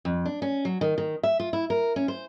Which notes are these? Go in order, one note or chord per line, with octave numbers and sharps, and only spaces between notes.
F2
D4
C#4
F#3
D#3
D#3
E5
F4
E4
A#4
C#4
C5